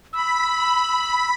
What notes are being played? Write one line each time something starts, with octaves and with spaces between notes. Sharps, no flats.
B5 E6